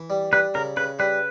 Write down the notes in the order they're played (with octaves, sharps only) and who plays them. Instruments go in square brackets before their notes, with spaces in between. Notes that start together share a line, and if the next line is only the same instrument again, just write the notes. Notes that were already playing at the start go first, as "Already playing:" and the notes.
Already playing: [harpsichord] E3
G3
[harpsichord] G3 [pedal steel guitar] B4
[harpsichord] C#3 [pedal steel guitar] A#4
[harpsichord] C#3 [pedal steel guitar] B4
[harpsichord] G3 [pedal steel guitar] B4